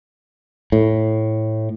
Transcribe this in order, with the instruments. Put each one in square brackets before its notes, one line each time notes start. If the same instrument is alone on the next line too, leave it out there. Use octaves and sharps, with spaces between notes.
[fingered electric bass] A2